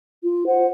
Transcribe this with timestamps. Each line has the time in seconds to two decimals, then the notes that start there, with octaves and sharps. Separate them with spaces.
0.24 F4
0.45 C5 F#5